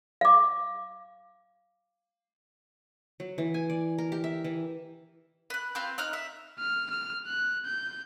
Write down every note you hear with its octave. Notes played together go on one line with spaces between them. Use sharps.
F5 D6
F#3
E3
G#5
D5
A#4
G4
E5
E3
B4 F#6
C4 F4 B4 G6
D#4 F6 F#6
E5
F6
F6
F#6
G6